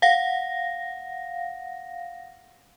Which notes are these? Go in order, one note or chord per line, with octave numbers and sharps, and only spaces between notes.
F5 F#5 A#6